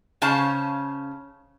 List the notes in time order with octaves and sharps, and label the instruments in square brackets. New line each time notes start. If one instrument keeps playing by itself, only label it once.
[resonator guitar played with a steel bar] C#3 C#4 C5 F5 A5